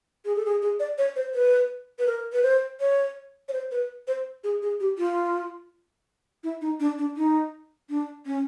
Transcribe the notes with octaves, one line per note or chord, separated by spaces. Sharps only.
G#4
A4
G#4
G#4
D5
C#5
C5
B4
B4
A#4
B4
C5
C#5
C#5
C5
B4
C5
G#4
G#4
G4
F4
E4
D#4
D4
D4
D#4
D4
C#4